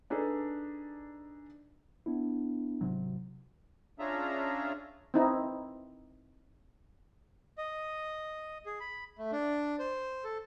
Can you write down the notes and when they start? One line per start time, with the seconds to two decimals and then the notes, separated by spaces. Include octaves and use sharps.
0.10 D4 D#4 G#4 A4 B4
2.06 B3 D4 E4
2.81 G#1 C3 F#3
3.99 C#4 D4 F4 G#4 E5 A#5
5.14 C4 D#4 E4
7.58 D#5
8.66 G#4
8.80 B5
9.18 A3
9.32 D4
9.79 C5
10.24 A4